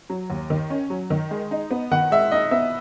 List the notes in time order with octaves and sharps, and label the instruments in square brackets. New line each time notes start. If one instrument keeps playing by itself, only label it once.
[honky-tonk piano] F#3
D#2
D#3
C#4
F#3
D#3
G#3
D#4
B3
[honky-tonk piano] D#3 [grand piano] F#5
[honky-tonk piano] G#3 [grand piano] E5
[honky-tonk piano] D#4 [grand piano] D#5
[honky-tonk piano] B3 [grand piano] E5